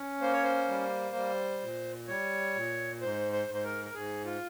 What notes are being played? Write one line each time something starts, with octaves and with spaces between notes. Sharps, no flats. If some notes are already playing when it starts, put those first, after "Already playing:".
Already playing: C#4
A#3 C5
C#5
C5
G3
G3
A#2
G3 C#5
A#2
G#2 C5
C5
G#2
C5
A#4
A#4
G#2 G#4
F4